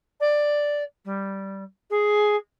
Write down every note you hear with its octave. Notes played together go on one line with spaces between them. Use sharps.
D5
G3
G#4